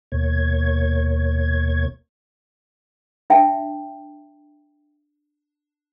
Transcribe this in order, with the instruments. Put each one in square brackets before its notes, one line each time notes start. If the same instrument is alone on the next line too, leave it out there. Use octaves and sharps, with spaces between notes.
[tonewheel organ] D#2 B2 A#3 C#5 G#6
[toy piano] D4 E5 G5 A5